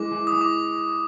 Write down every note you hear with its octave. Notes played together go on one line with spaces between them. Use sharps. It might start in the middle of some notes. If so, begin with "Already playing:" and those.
Already playing: E3 G#3 D6
E3
D#6
E3
D6